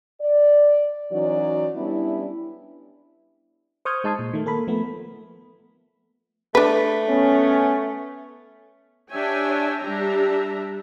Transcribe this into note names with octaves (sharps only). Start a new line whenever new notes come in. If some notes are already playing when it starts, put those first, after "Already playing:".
D5
E3 F#3 C#4 D#4 F#4 D5
G3 B3 C#4 D4 E4
C5 C#6 D#6 F6 G6 G#6
G#3 D#4 A5 C6 D#6 G#6
A#2
D#3 A3
A#3 A4 A#4 B5
F3 A3 B3
A3 D4 B4
B3 C#4
D4 G4 C#5 E5 G5 G#5
G3 D4 G4 E5 A#5